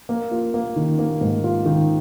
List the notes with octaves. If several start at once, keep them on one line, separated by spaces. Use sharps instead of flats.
A#3
F4
A#3
D#3
A#3
G#2
F4
D#3